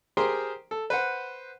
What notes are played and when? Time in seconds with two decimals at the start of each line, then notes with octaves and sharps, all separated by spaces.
0.17 G4 G#4 A#4 C5 G5 C6
0.71 A4
0.90 B4 C5 F#5